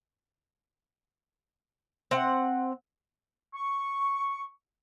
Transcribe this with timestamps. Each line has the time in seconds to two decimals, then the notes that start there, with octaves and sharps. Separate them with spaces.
2.11 C4 F#5
3.54 C#6